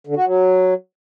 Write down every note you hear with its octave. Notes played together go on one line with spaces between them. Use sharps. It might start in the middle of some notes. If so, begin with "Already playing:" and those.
D3
F#4
F#3